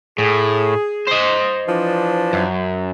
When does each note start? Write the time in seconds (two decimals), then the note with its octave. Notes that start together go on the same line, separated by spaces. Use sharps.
0.19 A2 G#4
1.07 C5 D#5
1.68 E3 F3 D4
2.33 F#2